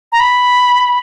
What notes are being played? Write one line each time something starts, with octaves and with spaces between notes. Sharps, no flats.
A#5
B5